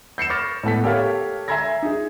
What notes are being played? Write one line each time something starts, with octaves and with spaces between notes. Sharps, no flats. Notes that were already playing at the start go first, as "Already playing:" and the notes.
G6 C7 C#7 E7
C#6 D6 F6 A6 A#6
A2 B3 A4 B6
G4 A4 A#4 C#5 F5 A5
E5 G#5 A#5 C6 G#6 A#6
D#4 G#4